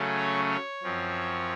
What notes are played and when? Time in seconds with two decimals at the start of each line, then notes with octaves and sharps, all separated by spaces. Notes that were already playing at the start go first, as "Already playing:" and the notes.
Already playing: C#3 F#3 A3 C#4
0.17 C#5
0.50 C#5
0.83 F#2 F3 C4